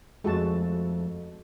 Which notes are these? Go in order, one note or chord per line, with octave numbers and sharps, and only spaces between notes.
F2 G#3 A3 F#4 A5